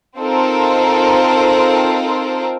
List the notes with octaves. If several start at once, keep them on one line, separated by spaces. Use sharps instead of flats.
C4 D#4 F4 A4 A#4